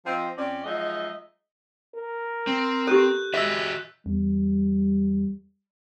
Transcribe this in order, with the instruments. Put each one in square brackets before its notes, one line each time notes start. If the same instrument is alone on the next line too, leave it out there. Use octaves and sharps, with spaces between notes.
[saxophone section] F3 C4 D#5
F2 C4 C#4 D5
F3 F#3 G#3 D#4 D#5 E5
[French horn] A#4
[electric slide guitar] C4
[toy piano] G4 A4 [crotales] F#6 G6
[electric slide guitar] F#4 G#4 D#5 [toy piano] E5 [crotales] E6 B6
[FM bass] E2 [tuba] G3